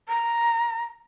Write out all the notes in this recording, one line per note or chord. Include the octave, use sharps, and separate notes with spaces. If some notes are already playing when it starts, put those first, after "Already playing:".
A#5